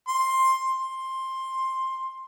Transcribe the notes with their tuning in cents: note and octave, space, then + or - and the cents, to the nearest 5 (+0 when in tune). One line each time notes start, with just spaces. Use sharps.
C6 +10
C6 +10